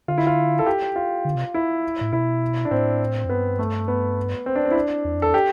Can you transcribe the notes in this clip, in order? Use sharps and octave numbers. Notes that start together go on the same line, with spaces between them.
D3 F4
E4
F4
A4
G4
F4
D3
C3
E4
A2
B2 E4
D4
A2 C4
F2
G2 B3
A3
B3
C4
D4
C4
E4
D4
E2
F2
E2 A4
G4